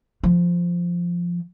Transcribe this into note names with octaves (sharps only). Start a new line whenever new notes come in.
F3